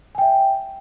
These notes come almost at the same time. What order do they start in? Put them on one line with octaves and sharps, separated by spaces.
G#5 G5 E5